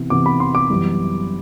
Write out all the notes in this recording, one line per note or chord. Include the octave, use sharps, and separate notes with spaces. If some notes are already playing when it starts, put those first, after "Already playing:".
Already playing: C3 E3 B3
C3 E3 B3 D6
B5
C6
D6
F#2 E3 G3 B3